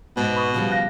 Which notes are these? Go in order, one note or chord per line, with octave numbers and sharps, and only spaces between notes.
G#2 B2 B3 D5
B5 C#6 D#6
C#3 F3 G3
F5 F#6 A#6